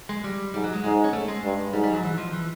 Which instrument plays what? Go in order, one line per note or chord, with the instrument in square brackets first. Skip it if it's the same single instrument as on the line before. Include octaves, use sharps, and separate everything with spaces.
[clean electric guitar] G#3
G3
[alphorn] G#2 [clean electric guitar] G3
[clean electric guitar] F#3
G#3
[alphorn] G#2 [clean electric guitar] G#3
[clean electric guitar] C#4
A3
G#3
[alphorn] G2
[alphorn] G#2 [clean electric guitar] G3
[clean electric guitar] G3
F#3
E3
F3
E3